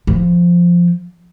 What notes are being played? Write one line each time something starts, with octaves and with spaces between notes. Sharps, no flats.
F3